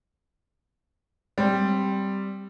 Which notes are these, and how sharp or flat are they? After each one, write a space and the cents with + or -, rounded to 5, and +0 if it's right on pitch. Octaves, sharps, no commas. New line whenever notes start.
G3 +0 C4 +0